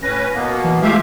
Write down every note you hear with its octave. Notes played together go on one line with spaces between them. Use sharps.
A2 C#4 B4 A#6
B2 A#3 B3
E3
G#3 A3 F4 G4 E5 F5